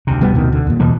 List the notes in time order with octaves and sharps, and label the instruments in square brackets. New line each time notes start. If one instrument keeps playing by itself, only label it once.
[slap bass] D2 C3
[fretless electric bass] D1 G3 B3
B2 D#3
D3
D#2 A#2
[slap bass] B2 E3 B3